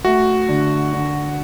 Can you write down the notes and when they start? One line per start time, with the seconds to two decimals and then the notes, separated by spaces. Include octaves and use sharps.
0.05 A3 F#4
0.48 D3
0.93 D3